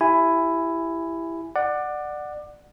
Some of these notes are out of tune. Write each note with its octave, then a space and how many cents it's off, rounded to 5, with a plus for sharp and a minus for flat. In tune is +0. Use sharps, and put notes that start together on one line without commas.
E4 +10 G4 +0 G#5 +0
D5 +20 F#5 +0